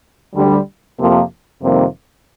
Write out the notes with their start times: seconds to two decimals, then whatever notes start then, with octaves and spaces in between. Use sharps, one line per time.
0.35 D2 D3 G3
0.98 F2 C3 F3 A#3
1.62 F2 C3 D#3 G3 A#3